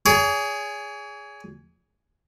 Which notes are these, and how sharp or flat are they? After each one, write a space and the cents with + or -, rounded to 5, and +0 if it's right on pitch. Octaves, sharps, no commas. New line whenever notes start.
G#4 +0 C#5 +45